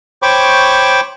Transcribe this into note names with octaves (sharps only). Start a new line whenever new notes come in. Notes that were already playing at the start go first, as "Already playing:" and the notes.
C5 C#5 G5 B5 C#6 D6